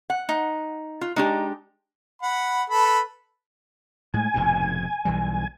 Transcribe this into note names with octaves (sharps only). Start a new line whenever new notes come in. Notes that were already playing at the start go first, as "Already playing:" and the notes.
F#5
D#4
F4
G#3 D4 D#4 G4
F#5 B5
A4 B4 B5
A2 G#3 G#5
F1 G#2 B2
B1 E3 G3